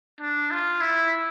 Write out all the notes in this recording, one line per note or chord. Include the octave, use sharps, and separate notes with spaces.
D4
F4
E4